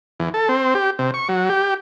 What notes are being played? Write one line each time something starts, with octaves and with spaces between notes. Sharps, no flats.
E2
A4
C4
G4
C3
C#6
F#3
G4